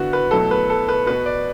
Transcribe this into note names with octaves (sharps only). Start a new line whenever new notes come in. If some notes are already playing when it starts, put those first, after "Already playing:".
Already playing: D3 B3 E4 F#4
B4
B2 F#3 A3 E4 A4
B4
A4
B4
B2 B3 F#4 B4
D5